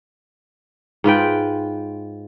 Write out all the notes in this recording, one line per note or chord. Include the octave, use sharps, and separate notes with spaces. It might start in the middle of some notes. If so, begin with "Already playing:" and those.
G#2 F4 B4 G5